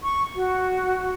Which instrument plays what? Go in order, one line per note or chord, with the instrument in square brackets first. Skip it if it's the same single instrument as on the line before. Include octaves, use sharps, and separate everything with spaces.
[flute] C#6
F#4